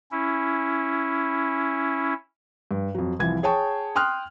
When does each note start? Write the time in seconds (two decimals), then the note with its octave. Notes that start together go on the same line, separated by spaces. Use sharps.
0.12 C#4 E4
2.71 G2
2.95 F2 F#3
3.19 C2 E3 F3 G#6
3.43 G#4 C#5 G5 A5 C#6
3.95 G5 C6 D#6 F6 F#6